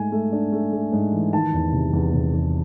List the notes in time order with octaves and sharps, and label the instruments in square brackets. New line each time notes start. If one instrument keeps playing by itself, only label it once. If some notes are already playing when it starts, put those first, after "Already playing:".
Already playing: [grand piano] G#2 A3 G#5
A3
D4
A3
A3
G#2
E3
D#3 A5
E2
C3
E2
C3
E2